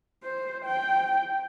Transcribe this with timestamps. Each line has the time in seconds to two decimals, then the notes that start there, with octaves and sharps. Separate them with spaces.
0.24 C5
0.65 G5